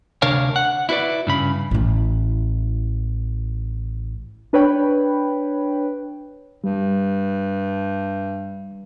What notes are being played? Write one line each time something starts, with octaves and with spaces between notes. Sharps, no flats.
D2 C3 D4 A#4 C#5 F5
F#5
E4 F#4 B4 D5
G2 C#3 B5
A1 E4
D4 B4 C#5 G5 B5
G2 G3